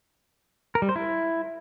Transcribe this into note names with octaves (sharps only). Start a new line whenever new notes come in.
A#4
G3
C5
E4